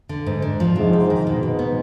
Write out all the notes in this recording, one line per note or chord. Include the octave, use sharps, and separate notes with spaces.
D3
G#2
D4
F3
G#2 C3
C3
D#3
G#2 B2
B2
B3